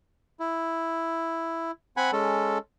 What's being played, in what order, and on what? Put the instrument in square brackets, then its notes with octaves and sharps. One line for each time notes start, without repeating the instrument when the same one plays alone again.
[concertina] E4
C4 F#5 G#5 B5
G#3 C#4 A4